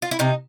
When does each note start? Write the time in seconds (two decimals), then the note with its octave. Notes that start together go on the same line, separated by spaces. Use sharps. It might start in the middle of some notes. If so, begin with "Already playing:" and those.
0.02 F4
0.11 E4
0.19 C3 D#4